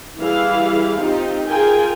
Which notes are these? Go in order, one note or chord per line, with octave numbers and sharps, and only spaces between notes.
E3 G3 E4 G#4 F5
C4 D#4 F4 G4
F4 G#4 A#4 G5 G#5